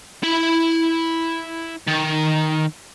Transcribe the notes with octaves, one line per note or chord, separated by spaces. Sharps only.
E4 B5
D#3